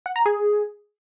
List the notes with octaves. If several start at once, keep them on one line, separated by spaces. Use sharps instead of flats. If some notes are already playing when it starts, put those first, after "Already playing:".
F#5
A#5
G#4